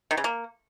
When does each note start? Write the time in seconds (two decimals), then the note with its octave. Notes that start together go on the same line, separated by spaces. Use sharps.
0.11 D#3
0.17 C#3
0.24 A#3